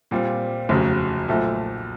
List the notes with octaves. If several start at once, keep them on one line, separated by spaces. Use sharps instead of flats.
A#2 G3 C4 F4
F1 D#2 C#3 F#3
B1 A#2 F3 A3